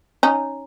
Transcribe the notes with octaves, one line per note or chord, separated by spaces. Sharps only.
C#4 D#4